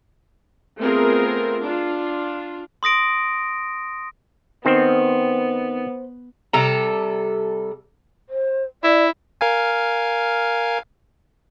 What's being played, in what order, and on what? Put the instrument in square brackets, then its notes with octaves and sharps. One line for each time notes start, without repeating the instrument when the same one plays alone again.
[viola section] A3 B3 C4 F4 G#4 A#4
D4 F4
[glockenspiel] C6 D#6 A#6 D7
[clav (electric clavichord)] D#3 C4 [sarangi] B3 [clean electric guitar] C5
[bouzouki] C3 G3 A4 A#5
[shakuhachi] C5
[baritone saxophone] E4 [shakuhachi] D5
[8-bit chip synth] A#4 F5 G#5